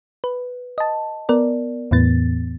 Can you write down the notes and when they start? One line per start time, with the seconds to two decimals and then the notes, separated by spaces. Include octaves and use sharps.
0.24 B4
0.78 D#5 A5
1.29 B3 A#4 D5
1.91 E2 A2 E3 B3 A6